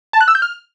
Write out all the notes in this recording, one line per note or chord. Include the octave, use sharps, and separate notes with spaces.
A5
F#6
E6
G6
F6